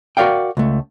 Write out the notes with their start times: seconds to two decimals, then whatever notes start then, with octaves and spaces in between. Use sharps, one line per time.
0.17 F#4 G#4 A#4 D5 F5 G5
0.57 C#2 A3